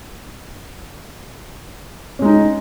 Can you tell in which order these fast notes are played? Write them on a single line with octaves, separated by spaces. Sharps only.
C#4 G#3 D#4